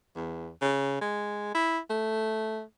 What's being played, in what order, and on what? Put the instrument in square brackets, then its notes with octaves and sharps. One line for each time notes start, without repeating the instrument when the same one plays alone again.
[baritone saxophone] E2
C#3
G#3
E4
A3